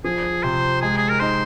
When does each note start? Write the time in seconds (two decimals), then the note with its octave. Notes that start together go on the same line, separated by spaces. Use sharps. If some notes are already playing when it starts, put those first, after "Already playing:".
0.04 F3 G#4
0.43 C3 C5
0.82 G#3 G#4
0.98 G#4
1.09 A#4
1.20 D#4 C5